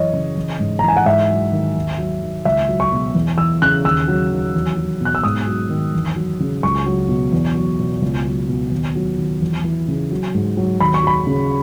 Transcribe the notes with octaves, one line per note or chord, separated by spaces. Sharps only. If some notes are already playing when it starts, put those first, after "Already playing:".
Already playing: F#2 E3 C#5 D#5
C#3
E3
G#2
A#5
E3 G#5
F#5
G#2 E5
F#3
D#3
D#2
F#3
D#3
C#2 E5
F#3
C#6
B2
E2
E3 E6
C#3 F#6
D#2 E6
F#3
D#3
E2
F#3
B2 F#6
E6
G#2 D#6
F#3
D#3
E2
F#3
C#3
C#2 C#6
F#3
B2
E2
F#3
B2
C#2
F#3
B2
D#2
F#3
D#3
E2
E3
C#3
F#3
G#2
F#3
D#2 B5
C#6
F#3 B5
C#3